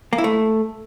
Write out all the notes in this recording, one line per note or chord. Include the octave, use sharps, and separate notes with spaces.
A#3
E4
A3